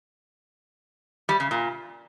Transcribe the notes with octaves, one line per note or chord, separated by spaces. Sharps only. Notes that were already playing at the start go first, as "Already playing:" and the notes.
G3
C#3
A#2